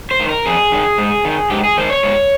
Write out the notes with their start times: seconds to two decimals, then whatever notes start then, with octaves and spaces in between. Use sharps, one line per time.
0.11 C5
0.20 D#3
0.29 A#4
0.46 F2 G#4
0.72 D#3
0.98 G#2
1.25 D#3
1.50 G#2 G4
1.64 G#4
1.77 D#3 C5
1.90 C#5
2.03 G#2